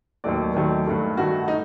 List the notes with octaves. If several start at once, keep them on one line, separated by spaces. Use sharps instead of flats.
D#2 D#3 F#3 A3 D5
D#2 D#3 F#3 A3
G2 D#3 A3
G2 D#3 A3 F#4
D#4